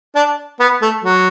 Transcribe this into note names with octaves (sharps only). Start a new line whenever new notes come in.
D4
B3
A3
F#3